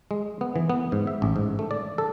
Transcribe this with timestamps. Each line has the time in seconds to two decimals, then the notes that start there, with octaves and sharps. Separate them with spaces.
0.11 G#3
0.41 B3
0.56 E3
0.70 B3
0.92 G#2
1.07 E5
1.22 A1
1.36 G#2
1.59 A3
1.71 D5
1.98 A4